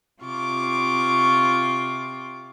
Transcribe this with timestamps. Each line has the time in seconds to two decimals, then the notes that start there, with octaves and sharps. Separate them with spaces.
0.22 C3 F4 C#6 D6